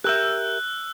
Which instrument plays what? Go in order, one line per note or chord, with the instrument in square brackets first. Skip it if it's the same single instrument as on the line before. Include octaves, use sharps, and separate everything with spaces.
[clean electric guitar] G4 A#4 E5 [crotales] E6 F#6